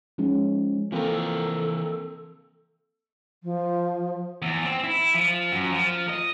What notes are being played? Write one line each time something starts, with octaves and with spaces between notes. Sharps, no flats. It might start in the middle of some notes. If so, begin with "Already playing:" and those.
F3 G#3 C#4 D#4
E3 F3 A#3 C4 A4 A#4
F3
E2
C4
E4
F3
F#2
F3
D#5